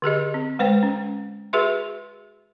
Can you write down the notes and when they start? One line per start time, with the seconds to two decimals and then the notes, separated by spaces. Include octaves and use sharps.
0.02 D3 G4 G#4 D#5
0.34 C4
0.59 G#3 B4 C5 G5
0.83 C#4
1.53 F#4 G#4 B4 E5 C6